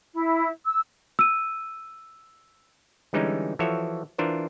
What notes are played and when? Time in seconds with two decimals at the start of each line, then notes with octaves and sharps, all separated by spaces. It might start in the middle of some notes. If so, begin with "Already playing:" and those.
0.13 E4
0.65 E6
1.19 E6 D#7
3.13 D3 E3 G3 G#3 C#4 D#4
3.59 E3 F3 F#4 A4 C#5 E5
4.19 E3 D4 F4 A#4 C5